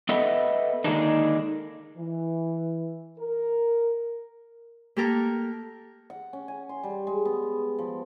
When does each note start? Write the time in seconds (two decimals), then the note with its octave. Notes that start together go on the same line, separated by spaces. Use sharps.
0.09 B3 A4 B4 D#5 E5
0.84 D3 D#3 G#3 A#3 D4 D#4
1.97 E3
3.19 A#4
4.96 A#3 G4 A4 A#4
6.10 F#5
6.33 C#4
6.48 G#5
6.69 C6
6.83 G3
7.07 G#3
7.25 B3
7.42 B3
7.78 F3